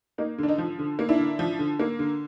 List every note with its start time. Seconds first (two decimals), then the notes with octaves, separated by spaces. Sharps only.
0.18 A#3 D#4
0.38 D3 D4
0.49 D#4
0.58 F3
0.79 D3
0.99 A#3
1.09 D4 E4
1.19 D3
1.39 F3
1.59 D3
1.80 A#3
1.99 D3